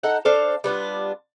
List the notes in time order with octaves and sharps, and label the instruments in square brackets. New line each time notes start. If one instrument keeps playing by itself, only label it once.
[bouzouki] D#4 A4 F#5
D4 A4 C5 F5
G3 B3 D4 F4